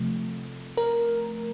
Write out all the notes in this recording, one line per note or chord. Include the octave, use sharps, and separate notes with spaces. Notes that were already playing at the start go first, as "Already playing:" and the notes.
Already playing: C3 F3 A3
A#4